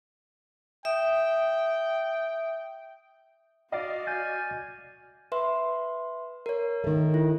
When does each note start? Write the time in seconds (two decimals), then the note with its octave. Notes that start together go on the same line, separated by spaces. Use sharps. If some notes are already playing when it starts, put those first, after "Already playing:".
0.85 E5 G5 D#6
3.72 F#4 D5 D#5 F5
4.07 G#5 F6 G6 A6
5.32 B4 E5 C6
6.46 A#4 C#5
6.84 D#3 A3
7.14 E4